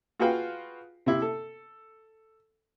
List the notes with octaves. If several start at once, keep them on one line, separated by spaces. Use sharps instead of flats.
F4 F#4 G#4 B4 F5 G5
C3 E4
A4